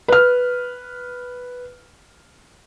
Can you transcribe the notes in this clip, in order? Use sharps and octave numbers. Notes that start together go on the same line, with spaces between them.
B4 F6